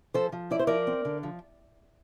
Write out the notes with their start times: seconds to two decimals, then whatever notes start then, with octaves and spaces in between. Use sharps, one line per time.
0.14 F3 A4 C5
0.32 F3
0.51 E4 D5
0.59 C5
0.67 F3 A#4 D5
0.87 C4
1.05 D3
1.23 F3